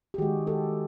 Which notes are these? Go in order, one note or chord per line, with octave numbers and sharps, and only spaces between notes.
G4
D#3 G#3 F#4 G#4
G4 A4